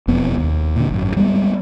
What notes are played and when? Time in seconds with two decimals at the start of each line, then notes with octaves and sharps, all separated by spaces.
0.08 E1 F2 B3
0.38 D#2
0.76 A#2 D3
0.90 G#1 F#2
1.17 G3 G#3 A#3 B3